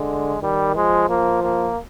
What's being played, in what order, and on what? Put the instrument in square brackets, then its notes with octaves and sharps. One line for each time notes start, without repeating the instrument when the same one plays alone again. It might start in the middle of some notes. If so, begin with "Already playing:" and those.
Already playing: [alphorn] D3 [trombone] G#3
[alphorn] D#3 [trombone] G3
[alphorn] F3 [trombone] G#3
[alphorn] F3 [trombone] A#3
[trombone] A#3